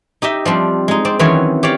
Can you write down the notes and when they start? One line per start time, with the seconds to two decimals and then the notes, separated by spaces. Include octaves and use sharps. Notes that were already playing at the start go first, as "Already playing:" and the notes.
0.22 D#4 G4 D#5 E5
0.45 F3 G3 C4 D4
0.88 G#3 D#4
1.05 C4 C5 D5
1.19 D#3 E3 F#3 C4 C#4 C#5
1.63 G4 C#5 D5 F5